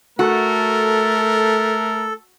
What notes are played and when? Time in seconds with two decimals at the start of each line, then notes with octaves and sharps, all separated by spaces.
0.19 A3 F#4 A4 A#4